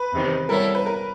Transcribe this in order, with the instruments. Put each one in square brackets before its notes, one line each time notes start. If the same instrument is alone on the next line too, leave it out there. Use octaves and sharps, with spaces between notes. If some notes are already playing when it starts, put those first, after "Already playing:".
Already playing: [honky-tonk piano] B4
[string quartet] E2 C3 D#3 G3
[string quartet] G3 B3 E4 A4 C#5 [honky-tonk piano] A#4
[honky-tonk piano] B4
A#4